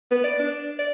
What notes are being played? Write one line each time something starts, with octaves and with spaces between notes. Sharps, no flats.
B3
D5
D4
D5